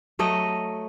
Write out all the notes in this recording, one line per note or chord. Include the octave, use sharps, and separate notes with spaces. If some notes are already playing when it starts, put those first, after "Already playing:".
F#3 A3 D#5